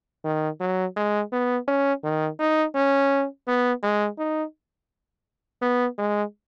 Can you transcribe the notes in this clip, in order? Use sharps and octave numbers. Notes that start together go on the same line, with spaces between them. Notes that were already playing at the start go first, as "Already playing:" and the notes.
D#3
F#3
G#3
B3
C#4
D#3
D#4
C#4
B3
G#3
D#4
B3
G#3